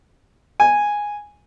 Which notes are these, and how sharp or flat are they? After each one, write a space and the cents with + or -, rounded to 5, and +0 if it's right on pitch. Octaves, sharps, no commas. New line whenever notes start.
G#5 -5